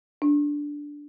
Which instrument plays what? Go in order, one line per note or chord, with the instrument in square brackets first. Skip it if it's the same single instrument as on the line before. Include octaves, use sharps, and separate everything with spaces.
[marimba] D4